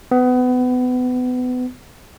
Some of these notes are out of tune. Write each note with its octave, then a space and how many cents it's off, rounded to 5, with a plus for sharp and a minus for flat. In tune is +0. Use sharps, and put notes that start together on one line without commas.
B3 +25